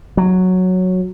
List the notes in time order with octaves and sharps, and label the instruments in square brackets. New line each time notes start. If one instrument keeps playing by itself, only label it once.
[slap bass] F#3